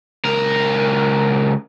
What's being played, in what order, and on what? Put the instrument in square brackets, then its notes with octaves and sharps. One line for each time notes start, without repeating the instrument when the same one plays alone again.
[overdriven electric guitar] C#2 A#4